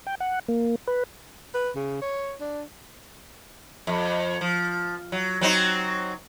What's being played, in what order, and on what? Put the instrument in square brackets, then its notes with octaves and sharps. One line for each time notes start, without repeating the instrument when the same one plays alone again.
[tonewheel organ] G5
F#5
A#3
B4
[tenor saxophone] B4
C#3
C#5
D4
[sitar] F2
F3
F#3
F#3 C4 D#4